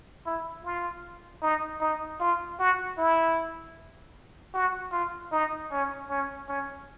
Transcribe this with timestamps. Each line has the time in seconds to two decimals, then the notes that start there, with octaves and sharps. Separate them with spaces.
0.26 E4
0.65 F4
1.42 D#4
1.81 D#4
2.20 F4
2.59 F#4
2.98 E4
4.54 F#4
4.92 F4
5.32 D#4
5.71 C#4
6.10 C#4
6.48 C#4